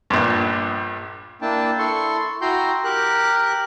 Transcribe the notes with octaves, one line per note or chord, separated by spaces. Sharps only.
A#1 G2
A#3 D4 E4 G5 A5
E4 A4 C6 C#6
E4 F#4 G5 A#5 C6 G6
G4 A#4 F#6